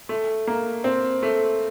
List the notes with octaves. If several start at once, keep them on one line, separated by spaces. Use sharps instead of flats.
A3
A#3
C4
A3